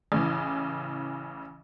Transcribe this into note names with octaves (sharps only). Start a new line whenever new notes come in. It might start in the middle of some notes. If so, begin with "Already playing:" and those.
A1 C#3 E3